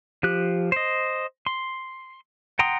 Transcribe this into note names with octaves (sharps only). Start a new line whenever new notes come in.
F3 G4 F#6
C5 D#5
C6
F#5 G5 A#5 C6 D#6